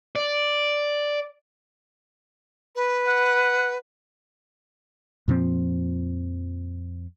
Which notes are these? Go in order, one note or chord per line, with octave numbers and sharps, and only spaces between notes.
D5
B4
F#5
F2 A#2 F3 C4